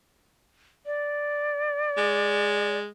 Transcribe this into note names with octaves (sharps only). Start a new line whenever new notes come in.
D5
G#3